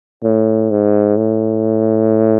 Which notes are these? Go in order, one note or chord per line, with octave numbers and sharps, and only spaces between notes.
A2
G#2
A2